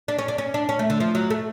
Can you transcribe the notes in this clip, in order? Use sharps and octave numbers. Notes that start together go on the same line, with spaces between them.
D4
C#4
D4
C#4
D4
C#4
A3
D3
F3
F#3
A3